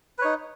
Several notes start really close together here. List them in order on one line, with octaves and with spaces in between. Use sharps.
B4 C#5 D#4